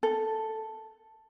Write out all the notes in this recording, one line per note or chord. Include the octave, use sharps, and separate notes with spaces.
A4